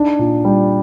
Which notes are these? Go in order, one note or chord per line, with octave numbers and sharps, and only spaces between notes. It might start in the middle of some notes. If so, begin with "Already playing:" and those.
Already playing: D4 D#4
A#2
G3